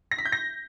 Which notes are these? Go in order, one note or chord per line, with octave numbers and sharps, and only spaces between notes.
A#6
B6
G6
A#6